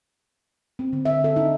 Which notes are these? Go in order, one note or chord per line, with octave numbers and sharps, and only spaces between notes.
C4
D3
E5
A4
D#4